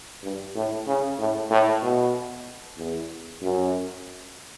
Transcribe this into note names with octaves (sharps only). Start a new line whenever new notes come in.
G2
A2
C#3
A2
A2
B2
E2
F#2